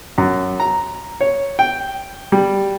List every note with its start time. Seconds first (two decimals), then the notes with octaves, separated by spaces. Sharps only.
0.18 F#2
0.60 A#5
1.21 C#5
1.59 G5
2.32 G3